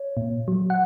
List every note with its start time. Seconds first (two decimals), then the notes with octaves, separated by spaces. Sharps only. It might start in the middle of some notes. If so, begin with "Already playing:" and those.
Already playing: C#5
0.17 A#2
0.48 F#3
0.70 F#5